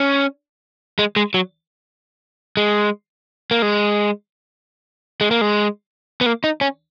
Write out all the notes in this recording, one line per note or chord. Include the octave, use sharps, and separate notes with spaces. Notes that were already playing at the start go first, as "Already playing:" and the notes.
Already playing: C#4
G#3
G#3
F#3
G#3
A#3
G#3
G#3
A#3
G#3
B3
A#3
D#4
C#4